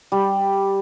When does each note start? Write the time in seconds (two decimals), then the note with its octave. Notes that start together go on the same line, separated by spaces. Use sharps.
0.12 G3